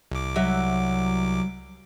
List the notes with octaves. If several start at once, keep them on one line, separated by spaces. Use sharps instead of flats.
C2 D6
F#3 E5